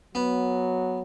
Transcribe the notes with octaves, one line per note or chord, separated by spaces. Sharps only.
F#3 B3